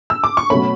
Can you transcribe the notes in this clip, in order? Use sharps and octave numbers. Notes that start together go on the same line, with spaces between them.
E6
D6
C#6
B2 F#3 A3 C#4 B5